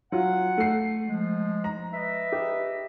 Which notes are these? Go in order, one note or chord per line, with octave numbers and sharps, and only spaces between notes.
F#3 F4 F#5
A3 C7
F3 G#3
A#5
B4 D#5 E5
G4